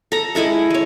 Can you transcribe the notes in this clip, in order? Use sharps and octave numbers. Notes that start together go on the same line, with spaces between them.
A4 A#5
G#3 E4 A4 E5
G#3 C#5